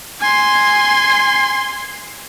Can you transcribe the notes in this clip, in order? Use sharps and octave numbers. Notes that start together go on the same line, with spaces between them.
G#5 C6